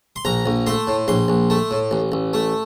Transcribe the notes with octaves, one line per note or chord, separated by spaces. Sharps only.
C6
A#1 A#5
A#1
A3 C6
A2
A#1 C6
A#1
A3
A2
A1
A1
A3